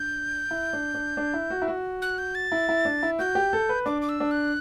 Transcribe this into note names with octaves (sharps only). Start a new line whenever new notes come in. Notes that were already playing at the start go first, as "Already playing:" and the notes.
Already playing: D4 G6
E4
D4
D4
D4
E4
F#4
E4
F#4
F#6
G6
A6
E4
E4
D4
E4
F#4 G6
G4
A4
B4
D4 D6
D6
E6
D4
F#6